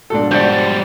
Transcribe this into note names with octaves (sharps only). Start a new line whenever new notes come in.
G#2 B2 F3 D4 A4
G3 F#4 C5 D5